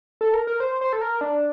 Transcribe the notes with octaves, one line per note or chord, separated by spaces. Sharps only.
A4
A#4
A#4
C5
C5
A4
A#4
D4